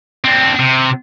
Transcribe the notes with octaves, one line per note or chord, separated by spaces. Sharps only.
C4 D4
C3